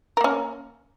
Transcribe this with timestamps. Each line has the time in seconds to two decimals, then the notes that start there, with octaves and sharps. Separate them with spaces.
0.17 A#4
0.21 A#3
0.24 C#4